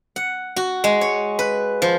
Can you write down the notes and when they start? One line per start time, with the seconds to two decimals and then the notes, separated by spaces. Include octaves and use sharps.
0.16 F#5
0.56 F#4
0.84 G#3
1.01 C#5
1.39 B4
1.82 F3